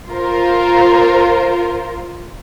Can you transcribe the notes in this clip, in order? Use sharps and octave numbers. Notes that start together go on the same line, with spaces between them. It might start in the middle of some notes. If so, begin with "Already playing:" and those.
F4 A#4 C5